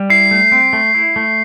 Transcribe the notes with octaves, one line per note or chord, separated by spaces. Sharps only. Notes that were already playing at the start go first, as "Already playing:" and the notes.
Already playing: G3
E4 C7
A3
C4
A3
E4
A3